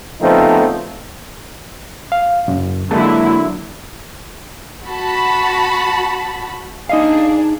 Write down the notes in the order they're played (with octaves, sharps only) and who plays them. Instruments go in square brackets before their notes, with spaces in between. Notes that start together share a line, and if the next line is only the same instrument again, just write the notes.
[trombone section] C#3 F3 A3 B3 C4 D#4
[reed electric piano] F5
F#2 C#3
[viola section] D3 F#3 E4 [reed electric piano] G#3 A#3 A5
[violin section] F#4 A5 B5
[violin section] D4 G#4 [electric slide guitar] D#4 D#5 F5